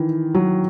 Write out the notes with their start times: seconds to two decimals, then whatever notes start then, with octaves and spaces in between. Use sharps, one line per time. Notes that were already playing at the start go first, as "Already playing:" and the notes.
Already playing: D#3 E3
0.35 F#3